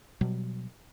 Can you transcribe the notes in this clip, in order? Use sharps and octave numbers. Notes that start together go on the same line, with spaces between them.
B2 F#3 G3